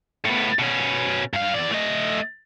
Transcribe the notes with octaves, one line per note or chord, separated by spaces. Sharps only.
A2 B3
B2 C#4
G2 F5
E2 D5
A3 D#5